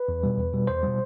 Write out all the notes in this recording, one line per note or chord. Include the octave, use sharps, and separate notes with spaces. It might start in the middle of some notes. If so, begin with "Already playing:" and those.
Already playing: B4
E2
B2 G3
E2
B2 G3
E2 C5
B2 G3